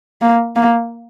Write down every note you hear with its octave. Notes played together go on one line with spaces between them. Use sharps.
A#3
A#3